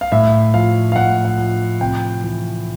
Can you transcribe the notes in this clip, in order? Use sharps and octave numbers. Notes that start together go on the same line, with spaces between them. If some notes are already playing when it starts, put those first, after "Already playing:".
F5
A2 E5
F3 F5
F5
A2 F#5
F#5
F3
C3 G5
E3